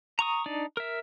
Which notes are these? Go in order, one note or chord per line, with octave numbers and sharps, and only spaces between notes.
A#5 C#6 D#6
D4 D#4 D5
A#4 E5